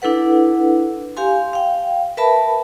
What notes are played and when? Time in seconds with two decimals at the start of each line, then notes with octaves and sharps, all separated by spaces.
0.02 D4 E4 A4 B4 F#5
1.17 G4 F5 G#5 C6
1.53 F5 G5
2.17 A#4 B4 E5 A5 B5